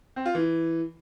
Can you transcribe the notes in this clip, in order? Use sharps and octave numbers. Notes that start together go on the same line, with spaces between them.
C4
F4
E3